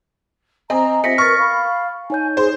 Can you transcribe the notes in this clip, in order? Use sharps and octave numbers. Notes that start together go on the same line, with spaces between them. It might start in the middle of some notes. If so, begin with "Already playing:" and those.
C4 D#5 G#5 A#5 D#6
C4 F4 G4 E5 A#6 B6 C#7
A#4 B4 C#6 F6 A6
F5 B5
D#4 C#5 G#5 G6
G#4 C5